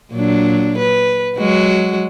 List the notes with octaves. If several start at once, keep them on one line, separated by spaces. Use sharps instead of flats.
A#2 F#3 D4
B4
F#3 G#3 F#4